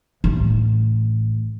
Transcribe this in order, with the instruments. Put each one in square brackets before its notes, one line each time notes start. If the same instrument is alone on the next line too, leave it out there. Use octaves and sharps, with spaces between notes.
[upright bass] A1